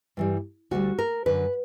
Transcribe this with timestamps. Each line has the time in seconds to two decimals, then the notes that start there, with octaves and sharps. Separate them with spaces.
0.17 G2 E3 G3
0.71 D2 D3 G3 F#4
0.99 A#4
1.26 F#2 D3 F#3 B4